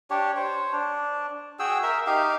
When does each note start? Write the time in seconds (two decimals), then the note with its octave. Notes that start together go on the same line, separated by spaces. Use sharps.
0.10 D4 G4 C#5
0.36 C5 C#5
0.72 D4
1.59 F#4 G#4 G5 E6
1.83 A#4 E5
2.07 D#4 G4 F5